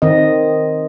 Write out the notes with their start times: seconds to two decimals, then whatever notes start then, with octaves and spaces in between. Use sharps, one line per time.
0.02 D#3 C4 D#5